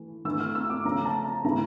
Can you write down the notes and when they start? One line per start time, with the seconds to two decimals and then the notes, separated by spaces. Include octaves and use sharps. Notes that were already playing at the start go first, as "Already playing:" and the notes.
Already playing: E3 A3
0.25 E3 A3 D4 E6
0.40 F6
0.55 E6
0.70 D6
0.85 C#3 F3 A3 C#4 A#5
1.05 A5
1.25 A#5
1.44 C#3 E3 A3 E4 A#5